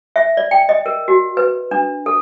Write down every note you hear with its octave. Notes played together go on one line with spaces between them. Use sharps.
E5
D5
G5
D#5
A#4
F#4
B4
D4
A4